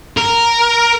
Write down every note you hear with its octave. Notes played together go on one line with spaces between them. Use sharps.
A#4